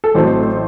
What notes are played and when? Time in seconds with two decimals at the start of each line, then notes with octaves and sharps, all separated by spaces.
0.04 A4
0.15 A1 A2 F#3 A3 C4 C5